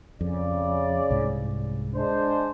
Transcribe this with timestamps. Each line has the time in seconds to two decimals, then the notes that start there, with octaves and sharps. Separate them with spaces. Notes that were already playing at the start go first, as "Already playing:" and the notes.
0.21 F2 C#3 D5
1.10 C2 G#2
1.95 G#3 D4 C5